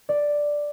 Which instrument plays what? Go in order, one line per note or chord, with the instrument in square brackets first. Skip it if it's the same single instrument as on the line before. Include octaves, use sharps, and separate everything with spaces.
[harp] D5